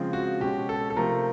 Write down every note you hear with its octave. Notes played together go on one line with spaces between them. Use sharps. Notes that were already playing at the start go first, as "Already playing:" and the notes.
Already playing: C#3 F3 G#3 C4
F#4
B2 G#3 C#4 G4
A4
A4
C3 F3 A3 C4 A#4